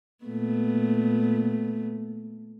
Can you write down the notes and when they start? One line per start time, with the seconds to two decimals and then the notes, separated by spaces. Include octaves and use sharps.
0.25 A#2 A3 B3